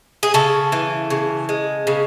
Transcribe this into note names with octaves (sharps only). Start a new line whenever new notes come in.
G#4
C#3 A4
E3
C#3
G#3
C#3